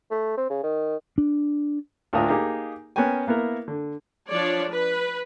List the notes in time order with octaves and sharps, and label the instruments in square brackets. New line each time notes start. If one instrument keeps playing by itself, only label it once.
[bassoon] A3
C4
C#3
D#3
[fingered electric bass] D4
[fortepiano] D2 A2 D4 F4 A#4 D#6
A#3 D#4 G4 G#4
B3 C#4 A#4 G5 G#5
A#3 B3 E4 A#4
D3
[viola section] F3 D4 C#5 D5
B4